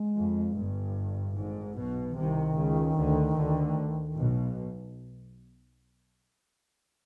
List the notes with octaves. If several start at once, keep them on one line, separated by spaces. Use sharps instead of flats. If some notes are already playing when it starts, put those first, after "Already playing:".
Already playing: G#3
F2
G1 G2
G#1 G#2
B1 B2
E3
C2 C3 D#3
C#2 C#3
D2 D3
D2 D3
B1 B2